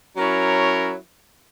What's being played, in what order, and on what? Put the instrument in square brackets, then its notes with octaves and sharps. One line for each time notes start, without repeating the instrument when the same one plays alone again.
[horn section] F#3 C#4 E4 A#4 C#5